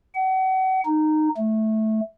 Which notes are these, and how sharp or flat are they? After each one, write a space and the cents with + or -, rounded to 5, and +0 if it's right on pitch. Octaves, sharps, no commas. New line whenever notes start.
F#5 +35
D#4 -15
A3 -10